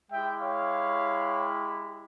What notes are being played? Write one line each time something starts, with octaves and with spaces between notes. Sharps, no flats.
G#3 E4 G4 E5 G5
C#5 F5